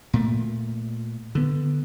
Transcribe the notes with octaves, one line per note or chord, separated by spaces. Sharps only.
A#2 A3
D3 B3